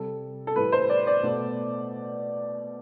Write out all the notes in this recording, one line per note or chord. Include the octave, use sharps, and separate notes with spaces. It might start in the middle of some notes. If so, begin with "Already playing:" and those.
Already playing: C3 G3 A4
A4
A2 E3 G3 B4
C5
D5
D5
B2 A3